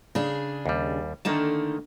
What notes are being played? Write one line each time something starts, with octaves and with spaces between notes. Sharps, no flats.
C#3 D4 G#4
D#2 G3
D3 D#3 A3 A#3 D#4 A5